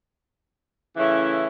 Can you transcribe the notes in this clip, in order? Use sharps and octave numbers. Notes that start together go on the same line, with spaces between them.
C#3 E3 A3 C#4 E4